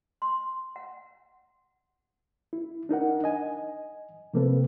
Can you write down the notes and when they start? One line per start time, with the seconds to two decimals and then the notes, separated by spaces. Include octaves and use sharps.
0.22 C6
0.76 F#5
2.53 E4
2.89 D4 D#4 A#4 F#5
3.24 D#5 G#5
4.34 C3 F3 A#3 C4 A4 B4